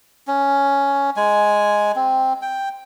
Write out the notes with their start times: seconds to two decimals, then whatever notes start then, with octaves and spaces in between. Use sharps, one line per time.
0.27 C#4
1.17 G#3 G#5
1.96 C4
2.42 G5